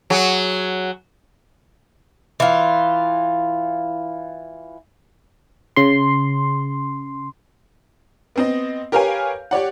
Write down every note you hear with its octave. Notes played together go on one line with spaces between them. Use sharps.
F#3 G#4
E3 F4
C#3 C6
B3 C4 D#5
G4 A#4 B4 C#5 F5 G#5
G4 C#5 D5 F#5